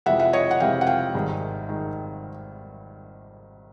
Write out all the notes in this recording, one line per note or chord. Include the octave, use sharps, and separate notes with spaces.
F2 C3 E3 G#3 E5 F#5
E5 F#5
C#5 D#5
F#5
F2 C3 E3 G#3 F5 G5
F#5
F5 G5
G#1 G2 D#3 G#3
D#3 G#3